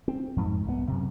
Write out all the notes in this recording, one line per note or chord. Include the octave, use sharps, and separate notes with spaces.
C4
F2 G#2
C2 B3
F#2 C3